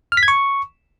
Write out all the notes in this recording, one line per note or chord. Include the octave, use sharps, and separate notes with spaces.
F6
B6
G#6
C#6